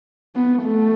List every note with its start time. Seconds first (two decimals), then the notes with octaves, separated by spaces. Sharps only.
0.36 B3
0.63 A3